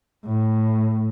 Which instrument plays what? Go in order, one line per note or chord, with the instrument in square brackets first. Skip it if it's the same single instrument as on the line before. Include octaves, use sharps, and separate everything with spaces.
[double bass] A2